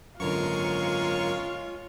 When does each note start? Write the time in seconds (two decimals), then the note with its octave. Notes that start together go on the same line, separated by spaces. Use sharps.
0.20 G#1 F#2 D3 G#3 F4 A#4 C#5 C#6